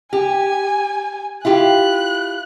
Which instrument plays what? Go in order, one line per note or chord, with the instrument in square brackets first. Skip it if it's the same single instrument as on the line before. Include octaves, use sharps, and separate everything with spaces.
[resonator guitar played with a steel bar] G4 [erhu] G#5
[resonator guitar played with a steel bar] E4 F4 G4 [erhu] F#6